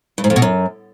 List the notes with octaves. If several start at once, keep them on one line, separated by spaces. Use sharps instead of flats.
G2
G#2
F2
B2
F#2